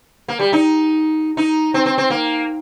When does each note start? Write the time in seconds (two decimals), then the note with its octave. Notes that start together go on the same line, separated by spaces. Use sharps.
0.28 A#3
0.39 G3
0.53 D#4
1.37 D#4
1.74 C4
1.86 C4
1.98 C4
2.10 A#3